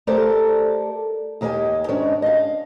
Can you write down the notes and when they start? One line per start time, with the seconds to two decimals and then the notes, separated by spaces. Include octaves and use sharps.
0.07 A3 G4 A4 A#4 C5 D5
1.41 D#2 D#3 G4 C#5 G#5
1.88 G#2 D#3 C#4 D4 D5
2.22 D#5 F5